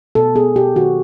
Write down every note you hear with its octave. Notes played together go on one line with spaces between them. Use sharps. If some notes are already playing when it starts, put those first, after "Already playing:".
B2 A4
B3 G#4
B2 G4
D#3 F#4